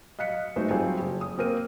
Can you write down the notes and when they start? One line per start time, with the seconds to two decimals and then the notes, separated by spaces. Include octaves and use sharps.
0.19 D#5 F5 F#6 B6 C#7
0.56 G#3 A3 D#4 F#4 C5
0.71 F#3 G3 C4 F4 G#4 A4
0.99 F#1
1.21 D#6
1.38 A#3 C4 A#4 D#7